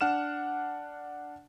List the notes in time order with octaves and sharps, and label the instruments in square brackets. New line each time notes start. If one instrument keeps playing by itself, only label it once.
[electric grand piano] D4 F#5 F6 E7